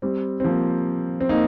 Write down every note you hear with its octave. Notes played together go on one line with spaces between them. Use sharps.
G3 C4
C4
F3 A#3
C4
A#3 D#4